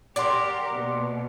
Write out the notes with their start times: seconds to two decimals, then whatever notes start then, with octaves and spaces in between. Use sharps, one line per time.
0.16 G4 A#4 D5 F#5 C6 D6
0.75 B2 A#3